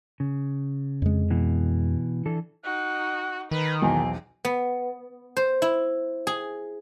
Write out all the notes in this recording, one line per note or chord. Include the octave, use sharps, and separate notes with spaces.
C#3
F2 G#3
B2 E3
E3 D4 A4
D#4 F#4 F#6
D#3 B4 A#5
B1 E2 C4 G#5
B3
C5
E4
G#4